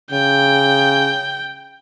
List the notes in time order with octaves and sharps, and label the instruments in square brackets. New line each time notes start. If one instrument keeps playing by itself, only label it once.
[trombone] C#3 [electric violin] G5